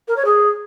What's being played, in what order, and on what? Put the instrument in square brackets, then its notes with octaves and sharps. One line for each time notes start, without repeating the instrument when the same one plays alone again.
[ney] A#4
C#5
G#4